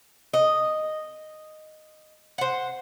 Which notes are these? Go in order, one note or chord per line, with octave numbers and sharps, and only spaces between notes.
D#5
C5 F#5